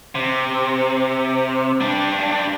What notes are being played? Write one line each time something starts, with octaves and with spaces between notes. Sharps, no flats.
C3
G3 D4